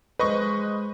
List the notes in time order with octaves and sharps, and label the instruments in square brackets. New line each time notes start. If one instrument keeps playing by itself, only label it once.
[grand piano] G#3 C5 [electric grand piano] B4 D#5 C#6